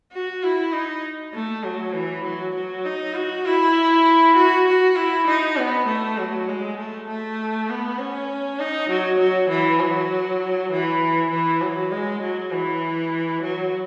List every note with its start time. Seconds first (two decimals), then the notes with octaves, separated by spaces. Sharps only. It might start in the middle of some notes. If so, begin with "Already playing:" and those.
0.13 F#4
0.43 E4
0.73 D#4
1.34 A3
1.64 F#3
1.94 E3
2.25 F#3
2.55 F#3
2.86 D#4
3.15 F#4
3.46 E4
4.36 F#4
4.67 F#4
4.96 E4
5.27 D#4
5.58 B3
5.87 A3
6.18 F#3
6.48 G#3
6.78 A3
7.08 A3
7.69 B3
7.99 C#4
8.60 D#4
8.90 F#3
9.19 F#3
9.49 E3
9.80 F#3
10.71 E3
11.31 E3
11.62 F#3
11.92 G#3
12.21 F#3
12.52 E3
13.43 F#3